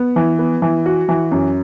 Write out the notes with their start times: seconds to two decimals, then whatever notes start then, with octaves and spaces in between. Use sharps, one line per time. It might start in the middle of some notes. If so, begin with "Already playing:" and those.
Already playing: B3
0.16 E3
0.39 B3
0.62 E3
0.86 F#4
1.09 E3
1.32 F#2